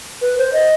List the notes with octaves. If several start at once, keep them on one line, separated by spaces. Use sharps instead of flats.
B4
C5
D#5